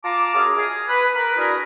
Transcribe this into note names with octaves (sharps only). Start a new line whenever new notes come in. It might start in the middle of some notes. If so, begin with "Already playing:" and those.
F4 A5 A#5 D6
F#2 G#4 A#5 F6
G#4
B4
A#4 B4
D4 E4 F#4 G#4 A#4